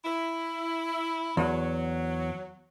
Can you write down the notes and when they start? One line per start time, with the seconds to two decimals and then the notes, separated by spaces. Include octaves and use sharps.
0.05 E4
1.37 E2 F#3